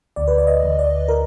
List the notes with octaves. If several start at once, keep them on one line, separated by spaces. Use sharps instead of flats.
D2 D5
B4
D5
D#5
D2
D5
A#4